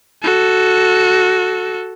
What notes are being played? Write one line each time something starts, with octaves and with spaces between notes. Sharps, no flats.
F#4 A4